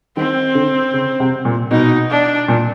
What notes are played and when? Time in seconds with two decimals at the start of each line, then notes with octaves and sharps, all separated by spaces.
0.17 D#3 C4
0.55 D3
0.94 C#3
1.20 C3
1.45 A#2
1.71 B2 D#4
2.10 D4
2.48 A#2